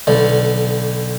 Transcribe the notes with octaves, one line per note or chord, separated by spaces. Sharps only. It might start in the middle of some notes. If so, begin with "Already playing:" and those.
B1 D3